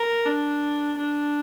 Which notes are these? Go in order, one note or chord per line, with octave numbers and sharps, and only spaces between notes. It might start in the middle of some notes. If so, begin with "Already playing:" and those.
Already playing: A#4
D4
D4